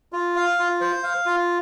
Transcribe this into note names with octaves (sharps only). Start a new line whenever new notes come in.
F4
F5
F4
C5
F5
F4